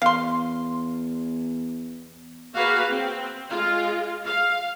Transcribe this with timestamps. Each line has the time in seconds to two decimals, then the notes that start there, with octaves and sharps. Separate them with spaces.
0.02 E2 F5 C6
2.54 A#3 F#4 G#4 B4 F5
2.90 C4
3.49 G#3 F4
4.25 F5